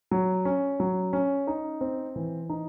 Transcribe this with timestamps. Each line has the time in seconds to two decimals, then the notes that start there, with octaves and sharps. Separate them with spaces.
0.11 F#3
0.45 C#4
0.80 F#3
1.13 C#4
1.47 D#4
1.81 C4
2.16 E3
2.50 D#4